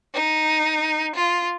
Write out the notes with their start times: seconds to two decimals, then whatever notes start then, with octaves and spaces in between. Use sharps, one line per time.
0.15 D#4
1.15 F4